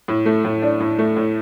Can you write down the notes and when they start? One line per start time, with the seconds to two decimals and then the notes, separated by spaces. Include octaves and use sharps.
0.08 A2
0.26 A3
0.45 A2
0.62 D4
0.80 A2
0.99 A3
1.16 A2